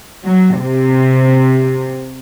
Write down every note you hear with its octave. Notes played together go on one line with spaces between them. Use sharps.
F#3
C3